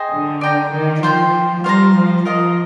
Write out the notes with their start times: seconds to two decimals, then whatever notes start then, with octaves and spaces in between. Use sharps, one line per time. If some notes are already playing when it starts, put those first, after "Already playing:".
Already playing: G#4 C5 D#5 G5
0.12 D3
0.41 D5 G5 A#5
0.72 D#3
1.03 F3 F4 C5 G5
1.64 G3 F4 C5 F5 A#5
1.95 F3
2.25 F3 F4 A#4 D#5